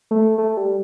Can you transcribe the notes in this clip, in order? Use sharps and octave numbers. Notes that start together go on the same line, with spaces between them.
A3
A3
G3